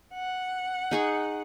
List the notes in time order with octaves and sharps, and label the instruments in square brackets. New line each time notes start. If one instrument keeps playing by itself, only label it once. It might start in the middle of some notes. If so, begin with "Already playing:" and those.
[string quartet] F#5
[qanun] D#4 G#4 C#6